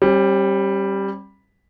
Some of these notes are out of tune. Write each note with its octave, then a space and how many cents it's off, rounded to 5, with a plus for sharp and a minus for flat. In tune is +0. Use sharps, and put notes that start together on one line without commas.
G3 +0 C#4 -45